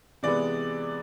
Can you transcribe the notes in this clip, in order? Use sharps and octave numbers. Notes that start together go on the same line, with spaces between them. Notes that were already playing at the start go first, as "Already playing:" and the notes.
C3 E3 G#3 B3 D5